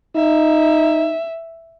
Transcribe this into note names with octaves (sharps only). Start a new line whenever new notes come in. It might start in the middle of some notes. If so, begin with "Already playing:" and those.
D#4 E5